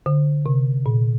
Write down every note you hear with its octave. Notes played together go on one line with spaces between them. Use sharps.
D3
C3
A#2